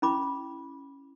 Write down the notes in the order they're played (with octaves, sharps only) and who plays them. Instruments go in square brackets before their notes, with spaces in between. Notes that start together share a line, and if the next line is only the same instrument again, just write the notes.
[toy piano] C#4 E4 B5 D6